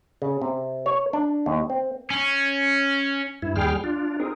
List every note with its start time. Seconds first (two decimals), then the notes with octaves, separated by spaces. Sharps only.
0.22 C#3
0.41 C3
0.86 C#5
1.13 D4
1.46 D#2
1.70 C4
2.10 C#4
3.42 G2 E4
3.56 D#2 G3 G#4 G5 F6
3.84 D4 F4
4.20 C4 D#4 G#4 A#4